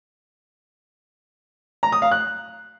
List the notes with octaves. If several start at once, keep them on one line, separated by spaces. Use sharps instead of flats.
A#5
D#6
F5
F#6